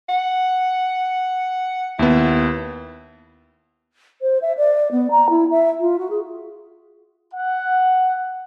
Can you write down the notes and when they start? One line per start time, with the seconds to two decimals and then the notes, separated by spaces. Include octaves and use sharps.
0.09 F#5
1.99 D#2 B3 E4
4.21 C5
4.41 E5
4.57 D5
4.91 B3
5.11 A#5
5.29 E4
5.51 E5
5.79 F4
5.98 F#4
6.10 G#4
7.33 F#5